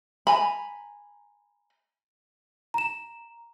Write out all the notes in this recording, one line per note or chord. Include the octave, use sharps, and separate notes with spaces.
G#5 A#5 B5
A#5 E7